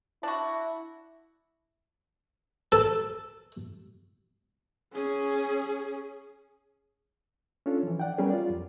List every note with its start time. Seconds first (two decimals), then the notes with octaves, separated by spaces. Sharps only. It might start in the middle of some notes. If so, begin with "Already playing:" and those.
0.23 D4 E4 F#4
2.72 A4
4.93 C#4 G#4
7.66 C#4 D4 F4 A4
7.83 E3 F3
7.99 D5 F#5 G5
8.18 F#3 G3 B3 C#4 G#4 A#4
8.30 F4 D5
8.50 F2